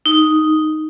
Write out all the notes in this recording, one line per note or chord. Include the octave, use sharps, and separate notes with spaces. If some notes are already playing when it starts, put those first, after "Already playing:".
D#4